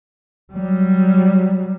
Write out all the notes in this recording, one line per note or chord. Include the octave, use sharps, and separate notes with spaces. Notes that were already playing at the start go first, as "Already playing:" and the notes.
F#3 G3